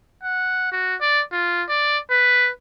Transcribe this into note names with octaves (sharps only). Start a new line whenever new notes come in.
F#5
F#4
D5
F4
D5
B4